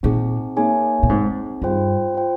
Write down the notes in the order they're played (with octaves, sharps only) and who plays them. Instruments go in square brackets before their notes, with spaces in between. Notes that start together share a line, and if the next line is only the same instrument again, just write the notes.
[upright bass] A#2 [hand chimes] C4 D#4 G#4
[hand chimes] A#3 D#4 G#4 C#5 G#5
[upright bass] A#2
[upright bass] G#2 [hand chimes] C4 D#4 G#4
[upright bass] G2 [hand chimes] F4 C5 G5
[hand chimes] F4 C5 G5